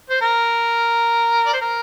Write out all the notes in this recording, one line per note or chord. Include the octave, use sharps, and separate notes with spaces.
C5
A#4
D5
C5
A#4